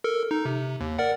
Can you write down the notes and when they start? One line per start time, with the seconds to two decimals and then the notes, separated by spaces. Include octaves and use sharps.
0.04 A4 A#4
0.31 D#4
0.45 C3
0.81 D#2
0.99 A#4 D5 F#5